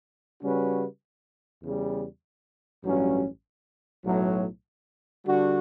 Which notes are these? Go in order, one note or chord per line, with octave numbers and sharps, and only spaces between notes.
C#3 G3 C#4 F#4 B4
E2 C#3 G3
A1 G2 F#3 C#4
B1 A2 F#3
D3 G3 D4 F#4